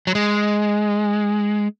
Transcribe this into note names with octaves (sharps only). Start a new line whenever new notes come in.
F#3
G#3